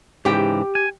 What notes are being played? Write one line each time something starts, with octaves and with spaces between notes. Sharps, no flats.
G#2 C#3 E3 G4 G5
G#5